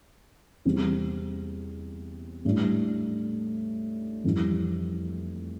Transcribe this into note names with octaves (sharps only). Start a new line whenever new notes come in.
E2 C3 G3 C4
A2 G3 D4
F2 E3 G3 C4